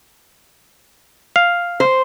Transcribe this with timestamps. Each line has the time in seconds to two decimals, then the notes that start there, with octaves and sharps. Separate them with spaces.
1.36 F5
1.80 C5